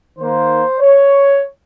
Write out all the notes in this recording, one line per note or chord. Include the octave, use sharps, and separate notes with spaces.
D#3 A#3 C5
C#5